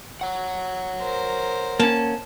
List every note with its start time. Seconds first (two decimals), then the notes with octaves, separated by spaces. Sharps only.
0.21 C#5 F#5
0.99 A#4 C5
1.80 A#3 C#4 A5